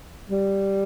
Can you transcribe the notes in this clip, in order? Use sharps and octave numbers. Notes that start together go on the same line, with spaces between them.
G3